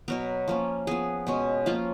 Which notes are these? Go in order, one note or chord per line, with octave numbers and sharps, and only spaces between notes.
B2 F#3 B3 A#4
F3 A#3 C#4
F3 B3 G#4
B2 G#3 C#4
F3 A#3 C#4 F4